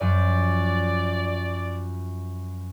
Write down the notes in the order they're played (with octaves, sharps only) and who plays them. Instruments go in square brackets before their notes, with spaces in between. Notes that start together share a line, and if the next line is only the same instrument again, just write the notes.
[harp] F#2 F3 [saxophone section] D5